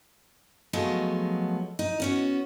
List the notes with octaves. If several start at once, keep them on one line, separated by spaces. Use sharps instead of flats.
F3 F#3 G#3 A3 B3 D#4
D#4
B3 C#4 F#4